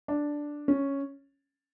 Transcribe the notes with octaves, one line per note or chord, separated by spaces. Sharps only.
D4
C#4